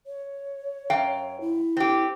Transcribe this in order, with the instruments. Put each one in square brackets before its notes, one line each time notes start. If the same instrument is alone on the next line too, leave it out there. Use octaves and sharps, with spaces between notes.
[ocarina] C#5
[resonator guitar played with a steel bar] F#2 F5 G5
[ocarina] E4
[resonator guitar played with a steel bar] C4 G4